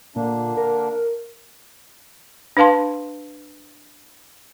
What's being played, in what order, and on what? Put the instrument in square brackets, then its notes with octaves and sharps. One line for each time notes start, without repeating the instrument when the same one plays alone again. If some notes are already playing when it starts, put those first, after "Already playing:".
[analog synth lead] A#2 [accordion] D3 A#3 D4
[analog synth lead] A#4
[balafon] D4 B4 F5 A5 C6